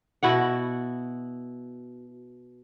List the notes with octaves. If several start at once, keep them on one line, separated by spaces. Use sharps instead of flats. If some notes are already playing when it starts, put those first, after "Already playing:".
B2 E4 F#4 F#5